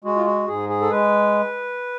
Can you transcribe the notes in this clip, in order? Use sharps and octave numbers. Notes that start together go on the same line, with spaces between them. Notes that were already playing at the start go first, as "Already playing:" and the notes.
G#3 F#4
F4
F#4
G#2 G#4
G#4
A4
G#3 B4